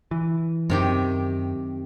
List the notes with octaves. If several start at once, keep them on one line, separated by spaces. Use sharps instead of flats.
E3
F#2 C3 D#3 G4